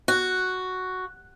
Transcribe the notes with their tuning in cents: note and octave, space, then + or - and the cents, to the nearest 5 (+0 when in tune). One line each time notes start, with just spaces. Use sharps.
F#4 +0